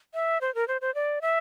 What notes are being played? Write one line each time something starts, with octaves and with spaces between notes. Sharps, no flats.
E5
C5
A#4
C5
C5
D5
E5